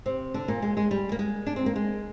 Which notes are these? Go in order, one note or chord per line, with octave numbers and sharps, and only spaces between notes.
C3 C4
D3 D4
A#2 A#3
G#3
G#3
G3
A#3
G#3
D4
C4
A#3
G#3